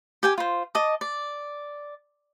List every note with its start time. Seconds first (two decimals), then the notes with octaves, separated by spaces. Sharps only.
0.23 G4 G5 G#5
0.38 F4 C5
0.75 D#5 A5 D6
1.01 D5